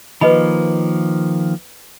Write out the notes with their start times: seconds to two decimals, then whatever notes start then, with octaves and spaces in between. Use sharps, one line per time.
0.21 D#3 F3 A#3 B4 D#5 B5